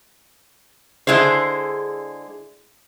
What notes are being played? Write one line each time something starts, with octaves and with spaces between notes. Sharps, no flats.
D3 G#3 E4 G#4 C5